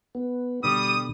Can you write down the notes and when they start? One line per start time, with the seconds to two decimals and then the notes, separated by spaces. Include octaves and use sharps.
0.15 B3
0.64 B2 D3 G3 D#6